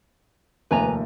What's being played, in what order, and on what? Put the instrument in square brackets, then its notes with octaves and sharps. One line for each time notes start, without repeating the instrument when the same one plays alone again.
[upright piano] F1 D#2 [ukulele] B4 G#5 A#5